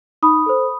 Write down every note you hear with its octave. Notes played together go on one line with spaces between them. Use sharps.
D#4 B5 D#6
A4 C5